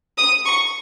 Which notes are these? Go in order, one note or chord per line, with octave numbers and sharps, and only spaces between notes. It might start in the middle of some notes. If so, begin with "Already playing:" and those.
D#6
C#6